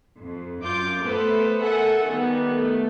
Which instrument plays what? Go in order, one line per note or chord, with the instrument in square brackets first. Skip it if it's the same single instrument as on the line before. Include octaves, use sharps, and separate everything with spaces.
[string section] F2
F#2 F4 D6 G6
A3 B3 A4 B4 C5
A4 A#4 E5 F#5 G#5
D#3 G3 B3
A3